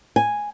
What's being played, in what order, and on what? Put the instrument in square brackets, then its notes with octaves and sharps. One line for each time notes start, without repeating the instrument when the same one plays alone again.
[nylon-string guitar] G#5